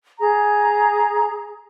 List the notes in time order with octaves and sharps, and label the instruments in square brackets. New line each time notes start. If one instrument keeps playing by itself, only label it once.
[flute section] G#4 A#5